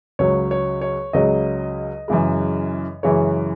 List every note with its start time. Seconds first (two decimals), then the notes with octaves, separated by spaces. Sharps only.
0.19 C#2 C#3 F#3 C#5
0.51 C#5
0.81 C#5
1.13 C#2 C#3 F#3 D#5
2.08 F#2 C#3 E3 G#3
3.03 F#2 C#3 E3 G#3 C#5